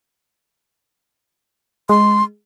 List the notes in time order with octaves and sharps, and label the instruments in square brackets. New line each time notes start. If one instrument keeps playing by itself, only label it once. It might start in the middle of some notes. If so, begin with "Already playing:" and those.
[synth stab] G#3 [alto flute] C6